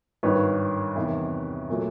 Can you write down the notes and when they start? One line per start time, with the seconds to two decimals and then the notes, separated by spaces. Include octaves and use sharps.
0.23 G#1 G2 D#3 B4 C#5
0.95 E2 C3 D#3
1.70 A#2 F#3 A3